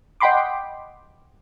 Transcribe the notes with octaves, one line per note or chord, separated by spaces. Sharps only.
D#5 F#5 G5 B5 C6 D6